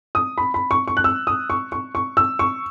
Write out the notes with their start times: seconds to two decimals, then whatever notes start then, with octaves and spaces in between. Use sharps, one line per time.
0.15 D#6
0.38 B5
0.54 B5
0.71 C#6
0.88 C#6
0.97 F#6
1.04 E6
1.27 D#6
1.50 C#6
1.72 C#6
1.95 C#6
2.17 E6
2.39 C#6